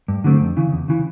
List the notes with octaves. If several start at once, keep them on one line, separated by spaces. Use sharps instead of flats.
G2
D3 F#3 A3 C4
F2
C#3 E3
E2
C#3 E3